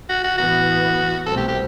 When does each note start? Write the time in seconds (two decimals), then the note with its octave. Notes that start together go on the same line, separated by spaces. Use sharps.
0.09 F#4
0.24 F#4
0.38 A2 E3 B3 F#4
1.26 C2 B2 A3 C4 A4
1.37 G4
1.48 G4